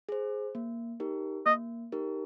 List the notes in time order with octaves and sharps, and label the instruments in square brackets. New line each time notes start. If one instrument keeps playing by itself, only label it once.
[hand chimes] G#4 C5
A#3
D#4 G4 A#4
[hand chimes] A#3 [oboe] D#5
[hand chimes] D#4 G4 A#4